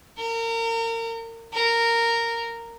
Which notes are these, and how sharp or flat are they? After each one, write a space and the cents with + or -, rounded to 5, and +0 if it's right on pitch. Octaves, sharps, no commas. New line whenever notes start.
A#4 -30
A#4 -10